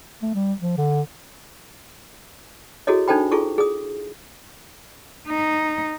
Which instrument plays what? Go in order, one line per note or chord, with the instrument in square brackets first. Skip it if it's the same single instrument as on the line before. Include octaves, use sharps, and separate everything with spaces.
[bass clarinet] A3
G3
F3
D3
[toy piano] E4 F#4 G#4 A4 C#5 D#5
D4 D#4 A4 C5 G5 B5
E4 F4 G#4 A4 C#6
G#4 D#6
[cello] D#4